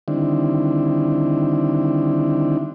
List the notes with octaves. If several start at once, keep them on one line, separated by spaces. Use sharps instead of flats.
D3 D#3 G3 C4 D4 E4